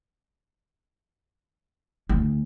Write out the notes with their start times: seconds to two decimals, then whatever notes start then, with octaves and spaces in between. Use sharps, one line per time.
2.09 D2